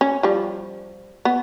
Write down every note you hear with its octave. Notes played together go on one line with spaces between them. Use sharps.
C#4
F3 G3
B3